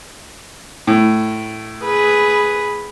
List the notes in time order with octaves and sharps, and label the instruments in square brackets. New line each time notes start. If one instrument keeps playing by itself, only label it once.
[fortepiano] A2
[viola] G#4 B4